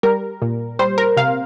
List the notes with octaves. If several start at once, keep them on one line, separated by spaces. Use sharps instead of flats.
G3 A#4
A#2
G3 C5
A#4
C3 F5